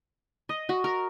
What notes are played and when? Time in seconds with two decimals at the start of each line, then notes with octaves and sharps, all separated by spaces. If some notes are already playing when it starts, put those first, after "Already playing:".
0.49 D#5
0.69 F#4
0.84 A#4